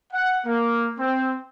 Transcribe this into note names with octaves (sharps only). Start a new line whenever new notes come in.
F#5
A#3
C4